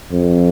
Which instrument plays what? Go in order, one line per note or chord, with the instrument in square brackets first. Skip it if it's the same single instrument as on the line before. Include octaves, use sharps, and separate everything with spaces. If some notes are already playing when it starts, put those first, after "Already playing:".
[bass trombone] F2